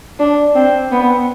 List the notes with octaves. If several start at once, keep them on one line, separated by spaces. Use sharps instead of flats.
D4
C4
B3